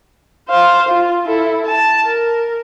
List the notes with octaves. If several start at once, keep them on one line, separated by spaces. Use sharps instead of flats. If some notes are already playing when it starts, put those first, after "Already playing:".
C5 F5
F4
E4 A4
A5
A#4